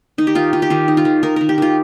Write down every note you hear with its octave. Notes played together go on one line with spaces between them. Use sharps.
D#3 D#4
G4
D#3 F4
D#4 F4
G4
D#3 F4
D#4
F4
D#3
D#4 A#4
D#3 A#4
G4
D#3 F4